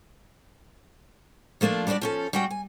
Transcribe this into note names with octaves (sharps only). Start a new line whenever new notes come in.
F3 A3 A#3 D4 F4
G3 D4 F4 F#4 D5
F3 C#4 A4
G3 C#4 F#4 F#5 G5
G#5